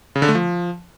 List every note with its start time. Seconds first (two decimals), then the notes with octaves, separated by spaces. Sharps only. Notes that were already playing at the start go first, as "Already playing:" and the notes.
0.16 C#3
0.22 D3
0.28 A3
0.35 F3